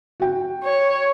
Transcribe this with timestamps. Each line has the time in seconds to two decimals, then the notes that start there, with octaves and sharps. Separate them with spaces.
0.20 F#4 G5
0.64 C#5